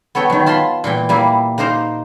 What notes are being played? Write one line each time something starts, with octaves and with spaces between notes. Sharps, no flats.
B3 A4 C#5 G5
D#3 F#3
F4 A5 B5 C6
A#2 E3 G5
G3 A#3 E4
A#3 D#4 A#4 C5 A#5